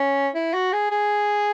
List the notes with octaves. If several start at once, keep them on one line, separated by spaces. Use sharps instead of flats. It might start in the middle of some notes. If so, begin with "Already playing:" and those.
Already playing: C#4
E4
F#4
G#4
G#4